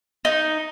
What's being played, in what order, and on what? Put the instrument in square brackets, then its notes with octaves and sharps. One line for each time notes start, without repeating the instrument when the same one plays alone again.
[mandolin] D#4